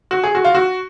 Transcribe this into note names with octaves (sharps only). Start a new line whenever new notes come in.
F#4
G#4
F#4
F4
F#4